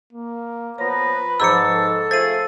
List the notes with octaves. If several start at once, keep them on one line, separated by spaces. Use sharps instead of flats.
A#3
F3 B3 B4 C#5 A#5
G#2 F3 C5 A5 A#5 E6 C#7
A4
A3 F4 G#4 C5 A6 D#7